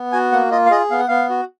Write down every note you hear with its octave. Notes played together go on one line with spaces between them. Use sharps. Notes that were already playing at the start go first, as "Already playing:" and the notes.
Already playing: B3
F#4 G#5
A#3 F#5
F4 D#5
F5
G#4 D#5
B3 F5
F#5
B3 F5
F#4